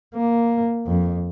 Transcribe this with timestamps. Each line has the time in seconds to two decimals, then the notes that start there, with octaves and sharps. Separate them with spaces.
0.15 A#3
0.87 F2